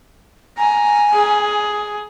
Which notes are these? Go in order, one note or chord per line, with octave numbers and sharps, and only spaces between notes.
G#5 A#5
G#4